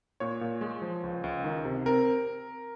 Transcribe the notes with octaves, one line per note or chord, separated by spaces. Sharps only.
A#2 C#5
A#2
G#3
F3
C#2
C#2
D#3
C3
C4 A#4